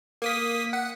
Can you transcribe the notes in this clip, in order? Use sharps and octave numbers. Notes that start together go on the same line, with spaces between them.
A#3 D#6 B6
F#5